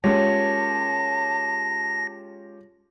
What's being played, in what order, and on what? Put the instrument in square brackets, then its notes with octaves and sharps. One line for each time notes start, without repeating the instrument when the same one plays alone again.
[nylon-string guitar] G#3 A#3 C#4 [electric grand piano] F4 G4 C#5 [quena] A5 [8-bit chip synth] A#6